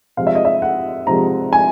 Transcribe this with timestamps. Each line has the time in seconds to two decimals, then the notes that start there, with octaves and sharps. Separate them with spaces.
0.17 C3 F3 G#3 F5
0.27 E5
0.35 D#5
0.45 E5
0.62 F#5
1.07 C3 F3 G#3 A#5
1.53 G#5